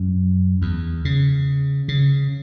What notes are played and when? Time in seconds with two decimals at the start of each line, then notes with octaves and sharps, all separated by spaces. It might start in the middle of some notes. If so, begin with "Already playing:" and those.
Already playing: F#2
0.62 E2
1.05 C#3
1.88 C#3